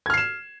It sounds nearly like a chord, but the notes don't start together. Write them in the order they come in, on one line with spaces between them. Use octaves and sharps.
G#6 F6 C7 E7